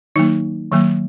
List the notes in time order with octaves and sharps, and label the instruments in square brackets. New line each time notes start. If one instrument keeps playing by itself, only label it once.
[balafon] D#3 F#3 A#3 D#4
D#3 F#3 A#3